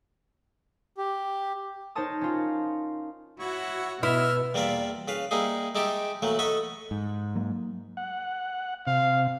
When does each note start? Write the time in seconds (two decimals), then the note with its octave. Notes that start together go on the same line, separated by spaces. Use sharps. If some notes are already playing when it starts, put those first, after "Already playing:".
0.97 G4
1.95 D#4 A#4 C5 C#5 A5 D#6
2.21 C#4 F4
3.40 E4 F#4 C#5 F#5
4.03 B2 E4 B4 D#5 E5 F6
4.54 E2 G3 A#3 F4 D5 E5
5.08 C#3 B4 F5
5.31 G3 A#3 D#4 E4 G#4
5.75 G#3 D#4 E4 G4 A5 D6
6.22 E3 F#3 A3 A#3
6.39 A4 D#5 F#5 B5 C#6
6.91 G#2
7.35 F#3 A#3
7.97 F#5
8.87 C3 F5